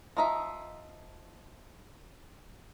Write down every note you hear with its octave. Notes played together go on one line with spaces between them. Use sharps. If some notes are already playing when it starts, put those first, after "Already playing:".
F3 D#4 E5